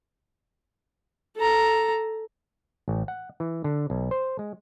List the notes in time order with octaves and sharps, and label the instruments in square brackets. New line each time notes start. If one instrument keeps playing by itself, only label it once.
[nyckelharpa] A4 A#5
[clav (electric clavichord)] A1
F#5
E3
D3
B1
C5
G#3